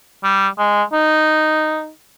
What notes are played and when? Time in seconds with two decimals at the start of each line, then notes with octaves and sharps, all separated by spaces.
0.24 G3
0.58 G#3
0.93 D#4